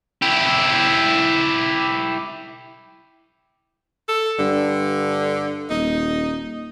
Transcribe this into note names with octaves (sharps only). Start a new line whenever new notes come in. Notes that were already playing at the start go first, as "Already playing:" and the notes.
E4 G4
A4
G2 D3
D#1 D#4